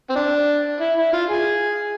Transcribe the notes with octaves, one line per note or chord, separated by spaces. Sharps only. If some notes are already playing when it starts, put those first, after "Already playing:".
C4
D4
E4
E4
F4
G#4